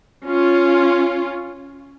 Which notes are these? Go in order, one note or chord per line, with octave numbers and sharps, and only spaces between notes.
C#4 F4